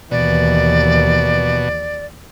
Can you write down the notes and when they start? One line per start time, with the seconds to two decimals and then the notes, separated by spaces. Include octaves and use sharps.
0.11 D#2 B2 E3 D5